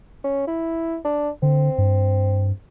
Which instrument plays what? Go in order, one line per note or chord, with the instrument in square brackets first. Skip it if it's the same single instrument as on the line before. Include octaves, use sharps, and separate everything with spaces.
[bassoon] C#4
E4
D4
[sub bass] D3 [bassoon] C4
[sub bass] G2